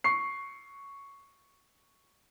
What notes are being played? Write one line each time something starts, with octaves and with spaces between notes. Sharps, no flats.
C#6 C7